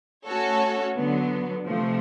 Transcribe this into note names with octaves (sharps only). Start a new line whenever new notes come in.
A3 C#4 F#4 A4 C#5
D3 F#3 B3
C3 F3 A3